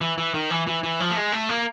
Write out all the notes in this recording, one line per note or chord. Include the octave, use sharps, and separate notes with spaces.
E3
E3
D#3
E3
E3
E3
F3
A3
G#3
A3
A#3